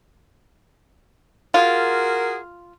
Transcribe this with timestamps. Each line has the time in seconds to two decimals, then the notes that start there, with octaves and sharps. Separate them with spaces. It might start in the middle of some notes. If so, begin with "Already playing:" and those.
1.54 F4 F#4 G#4 A#4